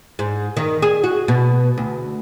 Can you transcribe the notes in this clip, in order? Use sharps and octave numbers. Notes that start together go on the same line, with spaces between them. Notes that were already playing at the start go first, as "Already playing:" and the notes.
G#2
D#3
G#4
F#4
B2
D2